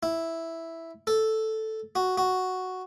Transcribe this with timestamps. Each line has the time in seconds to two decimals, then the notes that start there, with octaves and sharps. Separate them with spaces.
0.03 E4
1.07 A4
1.95 F#4
2.18 F#4